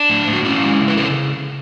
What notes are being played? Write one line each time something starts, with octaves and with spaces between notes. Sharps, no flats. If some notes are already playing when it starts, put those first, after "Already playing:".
Already playing: D4
A2
A2
F#4
C#4 E4
G#3
C#3
B4
C#3 A4